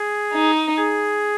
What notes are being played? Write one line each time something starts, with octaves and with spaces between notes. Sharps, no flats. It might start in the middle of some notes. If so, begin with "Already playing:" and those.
Already playing: G#4
D#4
G#4